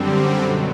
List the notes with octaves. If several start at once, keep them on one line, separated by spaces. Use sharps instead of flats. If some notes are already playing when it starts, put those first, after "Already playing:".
Already playing: F#2 D3 G3 C4
B2 F#3